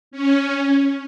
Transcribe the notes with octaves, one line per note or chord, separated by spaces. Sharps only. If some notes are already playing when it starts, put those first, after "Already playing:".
C#4